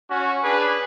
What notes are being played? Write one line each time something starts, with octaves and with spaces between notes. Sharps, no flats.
C#4 F#4
D4 G#4 B4